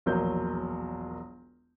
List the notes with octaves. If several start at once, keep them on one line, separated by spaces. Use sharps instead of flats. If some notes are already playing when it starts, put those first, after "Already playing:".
E1 A#1 F#3 A#4 G6